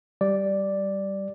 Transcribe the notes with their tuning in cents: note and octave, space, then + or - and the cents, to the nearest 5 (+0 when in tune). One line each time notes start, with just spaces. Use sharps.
G3 -5 D5 +0